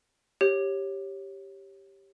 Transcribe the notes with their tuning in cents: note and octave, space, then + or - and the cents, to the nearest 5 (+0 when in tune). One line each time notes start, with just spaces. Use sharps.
G4 +0 C#5 -15